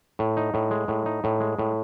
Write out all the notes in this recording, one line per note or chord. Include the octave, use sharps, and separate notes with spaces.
A2
D#4
A2
G#3
A2
D#4
A2
G#3
A2